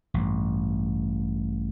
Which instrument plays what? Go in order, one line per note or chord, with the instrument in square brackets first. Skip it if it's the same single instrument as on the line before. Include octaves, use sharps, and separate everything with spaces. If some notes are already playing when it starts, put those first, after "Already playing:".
[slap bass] A1 G2